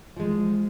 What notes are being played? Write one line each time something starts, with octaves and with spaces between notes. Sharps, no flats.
F3 G#3